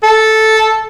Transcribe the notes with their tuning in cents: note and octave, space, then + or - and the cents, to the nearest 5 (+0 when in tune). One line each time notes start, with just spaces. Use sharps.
A4 -5